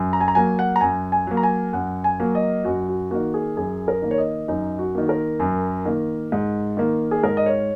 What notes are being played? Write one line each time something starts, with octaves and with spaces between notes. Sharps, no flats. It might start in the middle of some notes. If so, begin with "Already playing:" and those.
Already playing: F#2
A#5
G#5
A#5
F#3 A#3 G#5
F#5
A#5
F#2 G#5
G#5
F#3 A#3
A#5
G#5
F#2 F#5
G#5
F#3 A#3
D#5
F#2 F#4
F#4
D#3 A#3 F#4
G#4
F#2 G#4
A#4
D#3 A#3
C#5
D#5
F#2 D#4
F#4
D#3 A#3
A#4
F#2
D#3 A#3
G#2
D#3 A#3
G#4
G#2 A#4
D#5
C#5